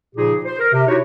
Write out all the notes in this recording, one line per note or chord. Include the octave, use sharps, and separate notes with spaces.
A#2 C#3 F3 D#4 G4 G#4
C5
A#4
C3
D#4 E4 F#4 G4 C#5